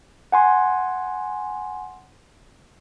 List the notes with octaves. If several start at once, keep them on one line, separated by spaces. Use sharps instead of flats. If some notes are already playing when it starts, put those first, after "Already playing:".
F#5 G#5 C6